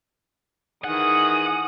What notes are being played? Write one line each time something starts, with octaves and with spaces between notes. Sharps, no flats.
D#3 E3 G#4 F#5 D#6